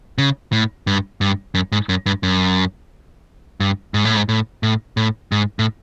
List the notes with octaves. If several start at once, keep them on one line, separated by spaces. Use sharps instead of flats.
C#3
A2
G2
G2
F#2
G#2
F#2
G2
F#2
G2
G#2
A2
G#2
A2
A2
A2
G#2
A2